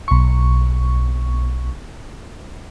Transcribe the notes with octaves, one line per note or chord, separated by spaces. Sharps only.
B1 C#6